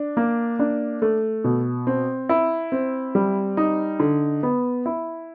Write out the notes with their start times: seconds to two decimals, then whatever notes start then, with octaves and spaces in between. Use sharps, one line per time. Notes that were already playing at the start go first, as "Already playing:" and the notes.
Already playing: D4
0.17 A#3
0.59 D4
1.02 A3
1.44 B2
1.87 C4
2.29 E4
2.72 C4
3.15 G3
3.57 D#4
4.00 D3
4.43 B3
4.86 E4